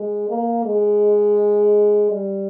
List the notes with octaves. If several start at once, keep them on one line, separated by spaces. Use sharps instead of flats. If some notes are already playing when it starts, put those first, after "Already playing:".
Already playing: G#3
A#3
G#3
G3